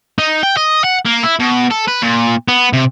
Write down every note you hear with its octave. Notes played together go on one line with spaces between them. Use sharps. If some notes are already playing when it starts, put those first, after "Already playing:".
D#4
G5
D#5
F#5
A#3
E4
B2
A4
B4
A#2
B3
C3